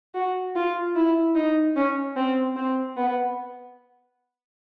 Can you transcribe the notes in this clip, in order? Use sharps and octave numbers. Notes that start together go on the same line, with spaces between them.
F#4
F4
E4
D#4
C#4
C4
C4
B3